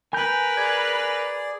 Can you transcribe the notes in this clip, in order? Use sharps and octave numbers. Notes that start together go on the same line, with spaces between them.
A#4 B4 G#5 B5 G6
G#4 D5 G#6